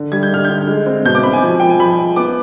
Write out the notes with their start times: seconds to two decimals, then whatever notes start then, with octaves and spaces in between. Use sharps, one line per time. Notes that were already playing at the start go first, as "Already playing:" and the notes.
Already playing: D3
0.12 G3 G#6
0.23 G6
0.30 D3 F6
0.45 D3 G6
0.67 G#3
0.86 C4
1.05 B2 G6
1.15 D6
1.23 C4 B5
1.33 G#5
1.42 F3
1.60 F3 G5
1.69 G#5
1.80 F3 B5
1.99 F3
2.16 B3 D6